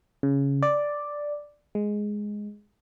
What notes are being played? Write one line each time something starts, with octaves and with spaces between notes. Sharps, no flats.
C#3
D5
G#3